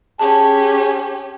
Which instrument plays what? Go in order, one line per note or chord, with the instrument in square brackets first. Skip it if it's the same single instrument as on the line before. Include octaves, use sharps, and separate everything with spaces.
[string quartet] C#4 G4 [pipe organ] G#4 [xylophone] A5